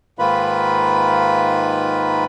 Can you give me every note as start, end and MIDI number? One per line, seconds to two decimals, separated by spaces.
0.19 2.25 44
0.19 2.25 51
0.19 2.25 58
0.19 2.25 65
0.19 2.25 71
0.19 2.25 83